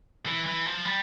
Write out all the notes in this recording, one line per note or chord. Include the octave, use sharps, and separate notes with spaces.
E3
E3
F3
G3